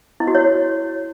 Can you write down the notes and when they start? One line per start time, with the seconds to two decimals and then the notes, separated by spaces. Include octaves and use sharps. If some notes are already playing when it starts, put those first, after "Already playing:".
0.20 E4
0.27 F#4
0.35 C#5